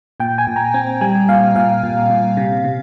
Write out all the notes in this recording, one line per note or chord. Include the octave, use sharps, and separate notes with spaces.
A#2 G5
G#5
A#2
A#5
C4 G#5
G3 G#5
A#2 F5
A#2 F5
A#2
A#2
C3
C3